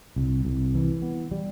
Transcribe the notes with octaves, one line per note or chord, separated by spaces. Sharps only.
C2
C2
E3
B3
G3